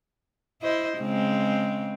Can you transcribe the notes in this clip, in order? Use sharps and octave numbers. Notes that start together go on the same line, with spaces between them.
E4 C5 D#5
C#3 G#3 C4